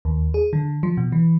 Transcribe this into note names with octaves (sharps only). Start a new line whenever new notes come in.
D#2
G#4
D3
F3
B2
E3